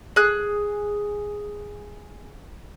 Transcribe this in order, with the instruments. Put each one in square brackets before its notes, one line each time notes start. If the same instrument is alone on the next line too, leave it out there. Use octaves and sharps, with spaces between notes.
[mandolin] G#4 F#6